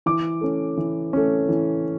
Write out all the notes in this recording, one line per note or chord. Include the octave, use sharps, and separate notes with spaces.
E3 D6
A3 C#4
E3
A3 C#4
E3